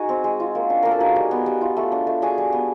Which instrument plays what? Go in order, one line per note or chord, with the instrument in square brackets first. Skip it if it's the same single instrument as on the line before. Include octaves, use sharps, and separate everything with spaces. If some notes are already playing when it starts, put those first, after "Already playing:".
Already playing: [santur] D#4 F#4 G#4
C4
G#3
F4
A#3
D4
A#3 A#4
A4
D#4 F#4 G#4
G3
B3
G3
F4
A3
D4
A3
D4 F#4 G#4
G3
B3